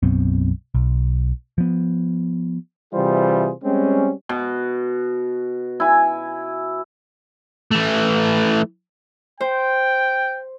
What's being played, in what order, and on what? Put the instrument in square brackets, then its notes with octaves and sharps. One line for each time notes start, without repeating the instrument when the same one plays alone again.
[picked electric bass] B1 F#2 B3 C4
B1
F3 B3
[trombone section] C3 E3 G3 F4 G#4 C5
G3 G#3 C4 C#4
[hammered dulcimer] B2
E4 G#5
[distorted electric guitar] E3 A3
[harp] C5 [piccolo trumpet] G5